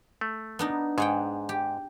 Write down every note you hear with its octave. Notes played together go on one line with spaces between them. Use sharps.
A3
B3 D4 D#4
G#2 G#4 F#5 G5
G4